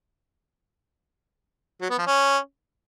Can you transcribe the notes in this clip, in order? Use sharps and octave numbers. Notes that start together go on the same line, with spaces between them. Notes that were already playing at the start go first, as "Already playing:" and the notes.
F#3
B3
F3
C#4